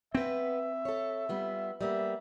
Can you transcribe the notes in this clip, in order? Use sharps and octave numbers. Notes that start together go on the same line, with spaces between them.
B3 C4 B4 E5
A4 C#5
G3 B3 F4
G3 A#3 B3 E5